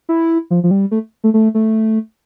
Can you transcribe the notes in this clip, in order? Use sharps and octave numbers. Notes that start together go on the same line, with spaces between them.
E4
F3
F3
G3
A3
A3
A3
A3